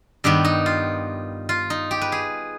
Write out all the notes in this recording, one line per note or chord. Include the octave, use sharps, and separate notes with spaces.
G2 D#3 B3 G4
D#4
F4
F4
D#4
G4
B4
G#4